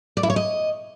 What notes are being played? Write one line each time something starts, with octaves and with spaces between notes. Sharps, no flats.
D5
E4
C#5
D#5